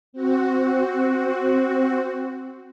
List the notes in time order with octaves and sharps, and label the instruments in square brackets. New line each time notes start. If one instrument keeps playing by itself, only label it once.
[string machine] C4 F#4